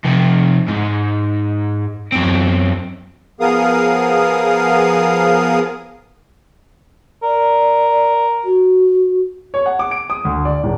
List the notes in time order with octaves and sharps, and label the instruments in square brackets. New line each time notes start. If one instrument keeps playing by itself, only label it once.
[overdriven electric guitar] F2 C3
G#2
F#2 C4
[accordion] F3 B3 G#4 A#4 F5 D#6
[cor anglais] A#4 [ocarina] D5
[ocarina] F#4
[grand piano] C#5
F#5
D6
D7
D#6
D2
D5
D#1